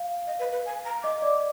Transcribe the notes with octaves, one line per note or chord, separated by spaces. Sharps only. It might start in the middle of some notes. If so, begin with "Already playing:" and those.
Already playing: F5
D#5
B4
B4
G#5
A#5
D#5 D6
D5